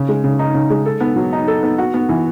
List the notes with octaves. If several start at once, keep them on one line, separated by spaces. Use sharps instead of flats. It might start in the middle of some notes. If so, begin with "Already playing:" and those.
Already playing: C#3
G#3
C#3
D#4
C#3
G#3
A4
B3
F#3
D#4
A4
B3
F#4
B3
E3